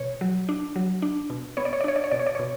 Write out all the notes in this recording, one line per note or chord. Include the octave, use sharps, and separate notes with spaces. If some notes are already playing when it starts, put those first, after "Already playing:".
Already playing: B2 C#5
F#3
D4
F#3
D4
B2
B3 C#5
D5
C#5
D5
D4 C#5
D5
C#5
B2 D5
C#5
D5
B2 C#5